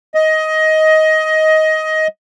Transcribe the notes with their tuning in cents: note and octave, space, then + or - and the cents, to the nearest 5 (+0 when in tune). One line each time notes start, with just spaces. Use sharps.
D#5 +15